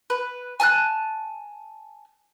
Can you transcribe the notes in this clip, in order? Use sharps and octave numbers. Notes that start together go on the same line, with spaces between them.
B4
G#5 A5 E6 F#6